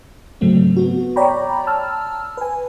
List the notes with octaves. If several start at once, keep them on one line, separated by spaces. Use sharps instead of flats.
G#2 C#3 F#3 A3 C4
B3 F#4
C#5 D5 G5 A#5 B5
A5 E6 F6
B4 G#5